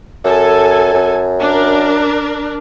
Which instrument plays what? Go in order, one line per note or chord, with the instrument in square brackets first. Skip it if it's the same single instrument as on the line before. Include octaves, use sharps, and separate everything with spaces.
[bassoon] F#2 [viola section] A4 G#5
[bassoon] F#2
[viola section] D4 A#4